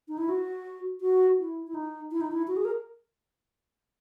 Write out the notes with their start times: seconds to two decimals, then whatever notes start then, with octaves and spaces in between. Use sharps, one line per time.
0.08 D#4
0.18 E4
0.29 F#4
1.01 F#4
1.38 E4
1.67 E4
1.75 D#4
2.11 E4
2.21 D#4
2.32 E4
2.48 F#4
2.57 G#4
2.65 A#4